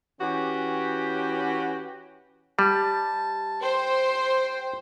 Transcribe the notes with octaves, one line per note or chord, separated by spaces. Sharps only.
E3 C#4 F#4 G4
G3 A5
C5 G5